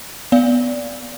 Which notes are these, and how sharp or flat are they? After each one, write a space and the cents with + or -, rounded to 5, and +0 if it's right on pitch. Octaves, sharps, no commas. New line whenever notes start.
B3 +0 D5 -15 F5 +0